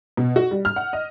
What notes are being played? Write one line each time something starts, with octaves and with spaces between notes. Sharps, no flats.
B2
F#4
G3
F6
F#5
D#5